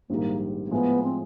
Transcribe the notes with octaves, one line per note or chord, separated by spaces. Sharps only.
A#1 G#2 D#3 G3 A#3
A#3
A2 F3 G#3 B3
C4